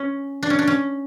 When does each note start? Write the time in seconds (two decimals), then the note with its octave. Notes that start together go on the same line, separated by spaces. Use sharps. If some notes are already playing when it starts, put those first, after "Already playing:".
Already playing: C#4
0.43 D4
0.50 C#4
0.59 D4
0.68 C#4